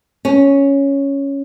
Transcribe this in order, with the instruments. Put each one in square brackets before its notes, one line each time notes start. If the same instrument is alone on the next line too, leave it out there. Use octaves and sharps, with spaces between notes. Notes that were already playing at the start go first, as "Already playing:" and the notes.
[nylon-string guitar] C#4